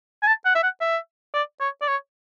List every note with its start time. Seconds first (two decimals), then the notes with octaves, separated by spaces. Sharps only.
0.23 G#5
0.27 A5
0.45 F#5
0.55 E5
0.63 F#5
0.81 E5
1.34 D5
1.60 C#5
1.82 D5
1.88 C#5